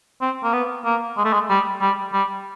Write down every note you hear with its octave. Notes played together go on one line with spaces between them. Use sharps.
C4
A#3
B3
A#3
G#3
A3
G#3
G3
G3
G3